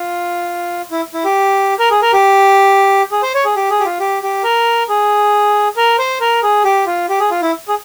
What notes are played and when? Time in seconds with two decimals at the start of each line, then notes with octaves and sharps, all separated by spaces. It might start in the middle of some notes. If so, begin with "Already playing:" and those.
Already playing: F4
0.91 E4
1.14 E4
1.24 G4
1.79 A#4
1.91 G#4
2.02 A#4
2.13 G4
3.12 G#4
3.23 C5
3.34 C#5
3.45 G#4
3.56 G4
3.70 G#4
3.80 G4
3.85 F4
4.00 G4
4.23 G4
4.44 A#4
4.89 G#4
5.77 A#4
5.98 C5
6.20 A#4
6.43 G#4
6.64 G4
6.86 F4
7.09 G4
7.20 G#4
7.31 F4
7.42 E4
7.68 G#4